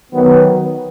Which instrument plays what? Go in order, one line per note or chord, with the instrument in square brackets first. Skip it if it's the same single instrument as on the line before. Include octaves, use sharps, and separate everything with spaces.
[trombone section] D#3 F#3 B3